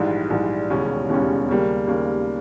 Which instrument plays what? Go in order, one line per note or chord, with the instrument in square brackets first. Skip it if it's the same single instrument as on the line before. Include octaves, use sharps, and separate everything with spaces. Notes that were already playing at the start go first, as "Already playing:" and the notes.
Already playing: [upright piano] A#1 G#2 E3 G3
A#1 G#2 E3 G3
E1 D#2 C#3 G3 C#4
E1 D#2 C#3 G3 C#4
D#2 C#3 G3 A#3
D#2 C#3 G3 A#3